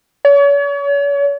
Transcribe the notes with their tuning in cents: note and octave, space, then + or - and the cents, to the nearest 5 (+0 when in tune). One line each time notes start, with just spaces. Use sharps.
C#5 +40